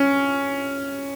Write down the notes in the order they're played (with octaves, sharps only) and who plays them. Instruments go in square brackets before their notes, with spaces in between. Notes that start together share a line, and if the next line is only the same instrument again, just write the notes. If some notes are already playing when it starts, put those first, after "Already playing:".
Already playing: [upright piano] C#4